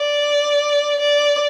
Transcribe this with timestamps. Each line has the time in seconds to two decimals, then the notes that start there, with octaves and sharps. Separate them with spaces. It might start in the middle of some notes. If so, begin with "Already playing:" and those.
Already playing: D5
1.00 D5